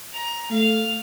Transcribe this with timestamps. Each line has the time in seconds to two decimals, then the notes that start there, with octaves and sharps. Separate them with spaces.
0.13 A#5
0.50 A3 F5